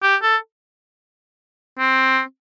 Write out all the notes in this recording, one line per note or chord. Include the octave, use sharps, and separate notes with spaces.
G4
A4
C4